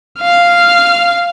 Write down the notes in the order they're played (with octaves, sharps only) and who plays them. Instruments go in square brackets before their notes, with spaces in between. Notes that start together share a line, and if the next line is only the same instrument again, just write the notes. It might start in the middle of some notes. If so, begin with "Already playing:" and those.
[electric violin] F5 F6